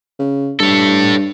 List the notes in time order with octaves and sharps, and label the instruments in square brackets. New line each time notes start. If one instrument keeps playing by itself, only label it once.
[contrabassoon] C#3
[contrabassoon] G2 [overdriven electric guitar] A4 C#5